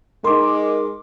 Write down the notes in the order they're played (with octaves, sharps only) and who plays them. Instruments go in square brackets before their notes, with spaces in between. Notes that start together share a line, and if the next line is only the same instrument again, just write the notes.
[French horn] G#3 [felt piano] D#4 C6 [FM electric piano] A#4 D6